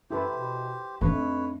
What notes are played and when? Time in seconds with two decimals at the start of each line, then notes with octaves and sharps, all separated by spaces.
0.11 F#2 E4 G4 A4 B4 C5
0.30 B2
1.01 F2 A3 D4 D#4 B4 C#5